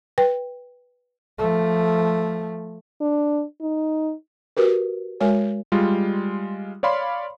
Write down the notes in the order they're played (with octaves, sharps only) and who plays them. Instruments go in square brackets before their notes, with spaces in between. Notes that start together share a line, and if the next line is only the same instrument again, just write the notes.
[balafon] B4 G5
[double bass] F3 A3
[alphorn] D4
D#4
[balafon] F#4 G4 A#4 B4
G#3 F#4 A#4 C#5 G#5
[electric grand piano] G3 G#3 F4
C#5 D5 F5 B5 C6